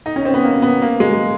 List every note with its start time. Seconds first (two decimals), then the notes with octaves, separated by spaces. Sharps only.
0.06 D#4
0.16 C#4
0.25 C4
0.34 B3
0.44 A#3
0.62 B3
0.82 A#3
1.00 G#3